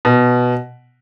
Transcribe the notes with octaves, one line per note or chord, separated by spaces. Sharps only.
B2